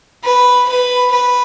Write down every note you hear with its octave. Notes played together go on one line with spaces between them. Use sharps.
B4
B4
B4